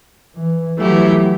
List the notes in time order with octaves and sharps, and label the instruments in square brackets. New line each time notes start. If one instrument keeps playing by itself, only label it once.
[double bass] E3
[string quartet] E3 A3 E4 G4 [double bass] F#3